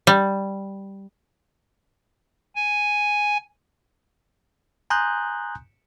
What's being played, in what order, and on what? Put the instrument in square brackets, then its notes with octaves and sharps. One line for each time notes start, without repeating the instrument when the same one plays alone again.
[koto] G3
[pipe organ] G#5
[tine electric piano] G#5 A#5 C6 D#6 F#6 G6